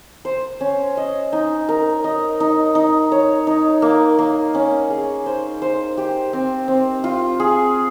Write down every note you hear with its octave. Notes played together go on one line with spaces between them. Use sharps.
C5
C#4
D#5
D#4
A#4
D#5
D#4
D#4
C#5
D#4
A#3
A#3
C#4
G#4
C5
C5
G4
C4
C4
F4
G#4